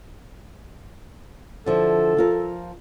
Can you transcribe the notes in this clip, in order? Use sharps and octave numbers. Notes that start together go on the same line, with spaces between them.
D3 F3 E4 A4
F3 F4 A#4